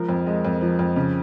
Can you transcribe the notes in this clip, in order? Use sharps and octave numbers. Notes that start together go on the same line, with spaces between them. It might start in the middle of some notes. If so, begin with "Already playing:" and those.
Already playing: C#2 F3 A#4
F2
G#3
F2
F3
F2
C#3